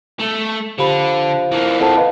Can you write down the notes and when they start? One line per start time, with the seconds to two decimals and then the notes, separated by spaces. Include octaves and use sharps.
0.20 A3
0.79 D3 F3 G4 B5
1.52 E3 A#3
1.80 F2 F#5 A5
1.97 B4 D#5 F5